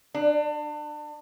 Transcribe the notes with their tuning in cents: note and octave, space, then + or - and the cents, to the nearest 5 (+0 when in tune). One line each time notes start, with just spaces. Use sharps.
D4 +30